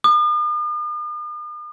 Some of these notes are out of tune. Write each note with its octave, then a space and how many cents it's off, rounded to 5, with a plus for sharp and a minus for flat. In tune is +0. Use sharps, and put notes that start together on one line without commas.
D#6 -45